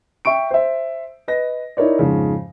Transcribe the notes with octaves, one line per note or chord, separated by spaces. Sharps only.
E5 G5 C#6 D7
C5 E5
B4 D#5 A#6
D#4 E4 A#4 C#5 D5
F2 G#2 C#3